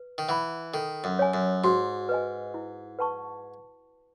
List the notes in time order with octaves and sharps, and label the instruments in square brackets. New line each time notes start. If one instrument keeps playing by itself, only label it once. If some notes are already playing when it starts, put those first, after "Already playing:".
Already playing: [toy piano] B4
[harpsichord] D#3
[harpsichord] E3 [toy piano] F#5 B5
[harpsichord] D#3 [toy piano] A4
[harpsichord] F#2
[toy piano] C#5 G#5
[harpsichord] F#2
[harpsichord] G#2 [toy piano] F#4
[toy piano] B4 D#5 G#5
E4
B4 F#5 A5 C#6